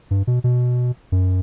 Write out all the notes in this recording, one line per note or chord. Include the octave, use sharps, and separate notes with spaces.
G2
B2
B2
F#2